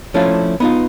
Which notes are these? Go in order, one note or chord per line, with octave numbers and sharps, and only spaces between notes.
F3 A3 C#4 D4 E4 F4
B3 D#4 F4